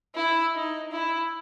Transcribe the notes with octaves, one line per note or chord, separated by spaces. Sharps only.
E4
D#4
E4